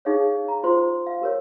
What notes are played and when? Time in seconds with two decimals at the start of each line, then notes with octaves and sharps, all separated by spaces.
0.05 D#4 G#4 C#5 F5
0.48 A#5
0.63 F4 C5 C6
1.07 F5
1.21 G4 A#4 C#5